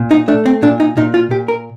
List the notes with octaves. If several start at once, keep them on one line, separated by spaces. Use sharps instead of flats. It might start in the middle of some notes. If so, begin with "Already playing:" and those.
Already playing: A#2
D#4
A3 D4
C4
A#2 D4
D#4
A#2 D#4
F4
A#2 G4
A#4